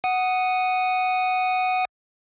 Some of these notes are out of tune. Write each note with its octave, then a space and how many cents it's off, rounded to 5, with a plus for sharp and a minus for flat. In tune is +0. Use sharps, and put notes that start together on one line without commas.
F#5 +0 D#6 +0